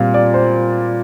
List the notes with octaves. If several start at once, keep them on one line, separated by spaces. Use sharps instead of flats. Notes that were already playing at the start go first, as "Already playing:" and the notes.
Already playing: A#2 G3 C4 F5
D5
C5